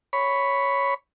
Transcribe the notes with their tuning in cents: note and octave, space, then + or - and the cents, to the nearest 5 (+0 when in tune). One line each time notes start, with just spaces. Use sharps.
C#5 +0 B5 +0